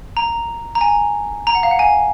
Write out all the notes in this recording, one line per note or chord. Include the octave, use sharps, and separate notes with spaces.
A#5
A#5
G#5
A#5
F#5
F5
F#5
G#5